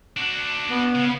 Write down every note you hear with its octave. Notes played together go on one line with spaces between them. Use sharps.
D4 F#4
B3
C#3